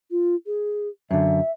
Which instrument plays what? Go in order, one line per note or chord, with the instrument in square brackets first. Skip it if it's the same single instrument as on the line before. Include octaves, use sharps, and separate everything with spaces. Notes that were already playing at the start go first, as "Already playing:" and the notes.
[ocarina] F4
G#4
[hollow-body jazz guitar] F#2 D3 [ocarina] E5